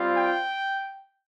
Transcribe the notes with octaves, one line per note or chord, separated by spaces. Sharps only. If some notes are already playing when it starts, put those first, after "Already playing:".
Already playing: G3 C4 F4
G5